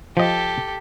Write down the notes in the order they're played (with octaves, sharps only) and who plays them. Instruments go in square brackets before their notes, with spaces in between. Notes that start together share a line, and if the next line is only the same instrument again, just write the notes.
[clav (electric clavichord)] F3 D#5 [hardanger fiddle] G4 A4